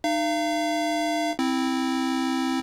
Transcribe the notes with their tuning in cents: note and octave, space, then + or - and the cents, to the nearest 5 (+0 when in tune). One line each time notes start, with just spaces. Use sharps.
D#4 -25 F5 -35
C4 +0 E4 -10